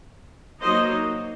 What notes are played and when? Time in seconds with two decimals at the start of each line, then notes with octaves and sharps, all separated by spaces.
0.62 F#3 A#3 D#4 C5 D#5